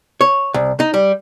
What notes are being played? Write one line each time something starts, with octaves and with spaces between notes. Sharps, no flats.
C#5
C2
D#4
G3